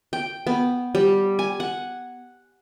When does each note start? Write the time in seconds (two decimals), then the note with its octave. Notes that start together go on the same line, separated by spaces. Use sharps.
0.13 G5
0.47 B3
0.95 G3
1.39 G#5
1.60 F#5